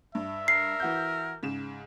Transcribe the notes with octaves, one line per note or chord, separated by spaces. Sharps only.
G2 E5
A#4 C7
E3 F#4 G6
G#2 C#3 E7